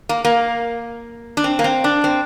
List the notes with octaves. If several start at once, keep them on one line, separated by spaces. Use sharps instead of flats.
A#3
A#3
D4
C4
A#3
C4
D4
C4